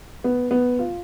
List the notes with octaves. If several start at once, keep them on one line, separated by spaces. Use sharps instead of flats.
B3
B3
F4